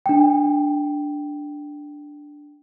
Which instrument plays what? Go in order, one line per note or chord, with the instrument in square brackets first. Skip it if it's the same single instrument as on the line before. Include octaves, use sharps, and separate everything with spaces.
[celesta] D4 G5